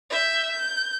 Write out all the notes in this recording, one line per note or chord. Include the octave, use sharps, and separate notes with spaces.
E5 G6
G6